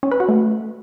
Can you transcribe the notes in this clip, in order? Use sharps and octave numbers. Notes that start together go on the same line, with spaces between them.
C#4
B4
F#4
A3